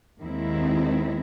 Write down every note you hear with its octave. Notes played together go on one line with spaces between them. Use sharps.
D#2 D#3 G#3 C4 E4